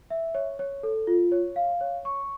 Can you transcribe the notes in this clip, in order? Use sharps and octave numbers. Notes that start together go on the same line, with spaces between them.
E5
C#5
C#5
A4
F4
C#5
F5
C#5
C#6